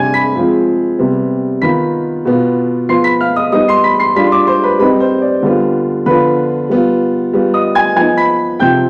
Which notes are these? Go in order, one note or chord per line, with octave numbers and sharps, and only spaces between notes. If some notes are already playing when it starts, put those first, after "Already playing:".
Already playing: C3 G3 D4 G#5 G#6
B5 B6
F3 G#3 C4 F4
C3 G3 B3
D#3 B3 F4 B5 B6
B2 B3 F4
F3 B3 F4 C6 C7
B5 B6
F5 F6
D#5 D#6
G3 B3 D#4 D#5 D#6
C6 C7
B5 B6
C6 C7
G3 D4 F4 B5 B6
C6
D5 D6
C5 C6
B4 B5
G3 C4 D#4 B4 B5
C5
D5
D3 G3 B3 F4
D3 F3 B3 F4 B4 B5
G3 B3 F4
G3 B3 F4
D#5 D#6
G#5 G#6
F3 B3 D#4 G#5 G#6
B5 B6
C3 F3 C4 G5 G6